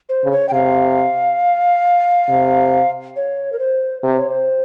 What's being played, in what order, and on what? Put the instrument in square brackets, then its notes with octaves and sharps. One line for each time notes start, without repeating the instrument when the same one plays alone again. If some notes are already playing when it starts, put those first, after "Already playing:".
[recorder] C5
[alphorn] C#3
[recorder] C#5
G5
[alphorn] C3 [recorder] F5
[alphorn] C3
[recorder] C#5
A#4
C5
[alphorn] C3 [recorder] C5
[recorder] C#5
C5